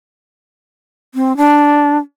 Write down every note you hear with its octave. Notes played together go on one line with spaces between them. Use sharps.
C4
D4